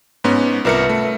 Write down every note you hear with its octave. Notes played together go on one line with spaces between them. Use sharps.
G#2 B3 C#4
C2 F4 A#4 B4 E5 C#7
A3